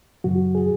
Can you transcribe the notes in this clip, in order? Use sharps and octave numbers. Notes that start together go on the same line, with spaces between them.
F#2 C#3 F#3 F#4
G#4